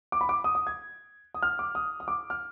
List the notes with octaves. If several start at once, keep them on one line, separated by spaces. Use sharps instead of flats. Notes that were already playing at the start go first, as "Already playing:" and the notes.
D6
B5
D6
D#6
D#6
G#6
D#6
F6
D6
D#6
D#6
D6
F6